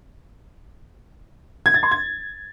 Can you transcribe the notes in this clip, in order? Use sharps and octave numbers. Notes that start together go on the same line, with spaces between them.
G#6
A6
C6
G#6